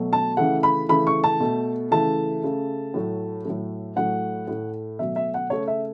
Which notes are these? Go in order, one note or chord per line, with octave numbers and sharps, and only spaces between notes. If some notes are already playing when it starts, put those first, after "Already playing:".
Already playing: B2 F#3 A3
A5
C#3 E3 A3 F#5
B5
C#3 E3 A3 B5
C#6
A5
B2 A3
C#3 E3 A3 A5
C#3 A3
A2 F#3 A3
A2 F#3 A3
A2 F#3 A3 F#5
A2 A3
B2 F#3 A3 E5
E5
F#5
C#3 A3 C#5
E5